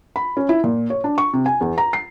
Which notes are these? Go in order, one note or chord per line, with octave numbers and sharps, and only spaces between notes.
B5
C#4
E4
A#2
C#5
D4
C#6
C3
G#5
E2
A#5
C7